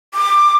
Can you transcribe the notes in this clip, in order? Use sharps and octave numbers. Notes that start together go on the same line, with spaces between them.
D6